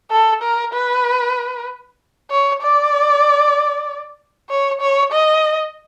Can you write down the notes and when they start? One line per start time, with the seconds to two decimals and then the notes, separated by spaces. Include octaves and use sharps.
0.11 A4
0.43 A#4
0.74 B4
2.31 C#5
2.62 D5
4.50 C#5
4.81 C#5
5.12 D#5